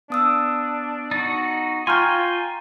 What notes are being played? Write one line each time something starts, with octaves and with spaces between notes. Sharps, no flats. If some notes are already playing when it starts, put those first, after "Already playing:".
B3 D4 D#6 E6
D#4 F#4 A6
F4 G5 G#5 A#5 C6 C#6 F6 G6
F4